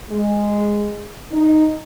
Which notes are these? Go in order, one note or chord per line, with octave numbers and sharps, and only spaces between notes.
G#3
D#4